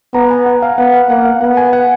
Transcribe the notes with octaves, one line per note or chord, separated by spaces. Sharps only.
B3 A#5
G#5
F#5
F5
B3 F#5
F5
A#3 F#5
F5
B3 F#5
G#5
F#5